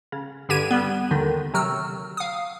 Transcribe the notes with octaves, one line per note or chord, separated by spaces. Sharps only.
C#3
G2 D3 G4 G#6 D#7
G3 B3
D#2 D3 D#3
C3 F#3 E6 F6
F5 D#6